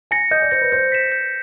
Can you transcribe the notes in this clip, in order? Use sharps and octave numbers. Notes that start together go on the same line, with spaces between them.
G#5 A#6 C#7
D#5 G6
D5
C5 A#6 C#7
B4
C5 G6
B6 E7
G6